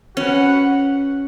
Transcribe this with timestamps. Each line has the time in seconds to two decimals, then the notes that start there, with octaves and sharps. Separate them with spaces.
0.16 C#4 F#4 B4 F#5